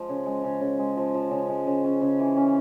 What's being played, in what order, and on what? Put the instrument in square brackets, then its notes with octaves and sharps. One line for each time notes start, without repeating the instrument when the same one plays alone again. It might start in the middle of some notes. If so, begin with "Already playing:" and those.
Already playing: [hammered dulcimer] F3 G#3
C#3
G#3
C#3
C#3
G#3
F3
F3
C#3
G#3
C#3
C#4
C#3
E3
C#4